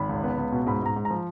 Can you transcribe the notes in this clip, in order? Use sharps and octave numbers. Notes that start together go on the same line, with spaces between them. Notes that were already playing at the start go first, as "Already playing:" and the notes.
Already playing: G#1 B5
C#2
B3
C#2
B2
G#2 B5
G#2 A#5
G#2
A#5
F3